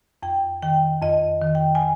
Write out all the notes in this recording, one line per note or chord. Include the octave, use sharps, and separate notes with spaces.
F2 G5
D#3 G5
F2 D#5
D#3
G5
G#5